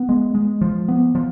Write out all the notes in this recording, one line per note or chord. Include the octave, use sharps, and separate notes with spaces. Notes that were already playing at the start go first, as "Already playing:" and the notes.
Already playing: B3
G#3
G#3
F3
B3
F3